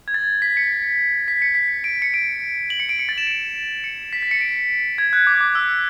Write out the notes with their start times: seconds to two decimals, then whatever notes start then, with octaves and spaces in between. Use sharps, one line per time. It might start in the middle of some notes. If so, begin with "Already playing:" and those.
0.08 G#6
0.14 A6
0.42 B6
0.57 C#7
1.28 B6
1.42 C#7
1.55 B6
1.84 D7
2.02 C#7
2.14 D7
2.70 F#7
2.80 C#7
2.89 D7
2.99 C#7
3.09 A6
3.18 E7
3.27 D7
3.84 C#7
4.13 B6
4.22 A6
4.31 C#7
4.41 D7
4.98 G#6
5.13 F#6
5.27 D6
5.41 D6
5.55 E6